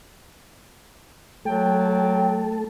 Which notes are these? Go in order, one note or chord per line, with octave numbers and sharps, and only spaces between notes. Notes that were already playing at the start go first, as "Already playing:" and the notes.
F#3 A3 A4 G5